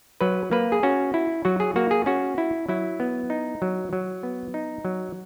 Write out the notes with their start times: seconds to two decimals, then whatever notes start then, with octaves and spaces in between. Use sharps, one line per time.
0.21 F#3 B4
0.51 A#3 B4
0.72 G#4
0.83 C#4 F#4
1.14 E4
1.45 F#3 F#4
1.60 G#4
1.76 A#3 F#4
1.91 G#4
2.06 C#4 F#4
2.38 E4
2.69 F#3 E4
3.00 B3
3.30 D#4
3.62 F#3
3.93 F#3
4.23 B3
4.54 D#4
4.85 F#3